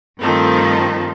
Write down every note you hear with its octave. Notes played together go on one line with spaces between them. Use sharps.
G2 D#3 F3 A3 C4 A4